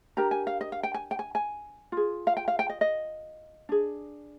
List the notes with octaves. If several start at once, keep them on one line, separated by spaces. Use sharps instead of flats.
D4 G4 A#4 A#5
G#5
F5
D#5
F5
G5
G#5
G5
G#5
G#5
F4 G#4
F5
G5
F5
G5
D#5
D#5
D4 G#4